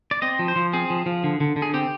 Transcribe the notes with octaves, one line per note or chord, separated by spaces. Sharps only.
D5
C4 D#5
F3
C5
F3
C4 G#4
F3
F3
D3
D3
D3
G#4
C4 G4